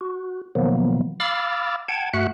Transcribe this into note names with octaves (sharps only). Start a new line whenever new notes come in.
F#4
B2 D#3 F3 F#3 A#3 B3
F5 B5 D6 E6 F6 A6
F#5 G5 A5 G#6
G2 A3 F#4 E5 F#5 F#6